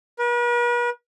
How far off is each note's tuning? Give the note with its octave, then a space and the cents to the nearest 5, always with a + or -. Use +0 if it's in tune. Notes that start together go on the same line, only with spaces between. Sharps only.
B4 -45